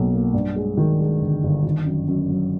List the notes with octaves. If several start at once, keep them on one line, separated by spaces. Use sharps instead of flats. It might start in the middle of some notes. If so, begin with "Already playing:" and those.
Already playing: B1 B2 F#3 A#3
A#3
G2
G#3
D#3
G#3
G1
G1
D#3
F#2
F#2
F#3